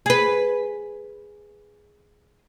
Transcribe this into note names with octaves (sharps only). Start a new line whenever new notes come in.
G#4 B4